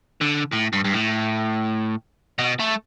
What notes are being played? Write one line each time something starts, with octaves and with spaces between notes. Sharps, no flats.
D3
A2
G2
G2
A2
B2
A3